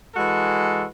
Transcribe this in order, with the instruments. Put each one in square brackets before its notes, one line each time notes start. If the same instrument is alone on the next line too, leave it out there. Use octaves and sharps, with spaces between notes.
[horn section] E3 G#3 F#4 A4